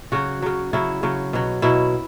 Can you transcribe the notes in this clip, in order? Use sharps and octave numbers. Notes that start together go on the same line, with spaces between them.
C#3 F#3 F#4
C#3 F#3
C#3 F#3 E4
C#3 F#3
B2 F#3
B2 F#3 E4